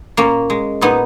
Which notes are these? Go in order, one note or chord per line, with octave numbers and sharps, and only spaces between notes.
A#2 A#3 C#4
G#3
A#2 B3 D#4